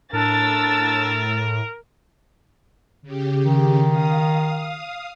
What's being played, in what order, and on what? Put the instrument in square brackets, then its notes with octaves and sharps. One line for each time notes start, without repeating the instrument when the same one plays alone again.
[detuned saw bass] A2 [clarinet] D4 [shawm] A#4 [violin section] E6 A6
[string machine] C#3 G4
[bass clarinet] D#3
[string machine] F5 D#6